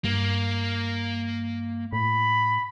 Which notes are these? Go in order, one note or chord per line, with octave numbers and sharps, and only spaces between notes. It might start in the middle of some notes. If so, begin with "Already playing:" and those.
G2 A#3
A2 B5